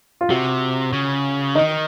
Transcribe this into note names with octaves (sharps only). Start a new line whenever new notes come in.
F4
C3 F#4
C#3
D#3 D#4